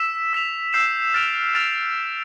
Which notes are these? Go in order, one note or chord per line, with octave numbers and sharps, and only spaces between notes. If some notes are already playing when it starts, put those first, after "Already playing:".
Already playing: E6 B6 E7
E6 B6 F7
E6 G6 C7 E7
F6 A6 D7 F7
F6 A6 D7 F7